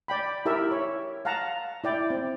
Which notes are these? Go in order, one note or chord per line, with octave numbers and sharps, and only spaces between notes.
D5 G5 B5
E4 G4 A#4 E5
C#5
F5 F#5 A5 A#5
E4 D5 G5
C4